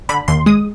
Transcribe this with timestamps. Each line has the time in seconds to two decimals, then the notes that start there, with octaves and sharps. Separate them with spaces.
0.09 D3 B5
0.28 D#2 C6
0.46 G#3 D#6